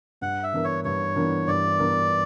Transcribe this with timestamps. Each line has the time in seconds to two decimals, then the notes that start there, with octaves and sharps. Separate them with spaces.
0.22 G2 F#5
0.43 E5
0.53 E3 B3 D4 A#4
0.64 C#5
0.84 G2 C#5
1.16 E3 B3 D4 A#4
1.47 G2 D5
1.79 E3 B3 D4 A#4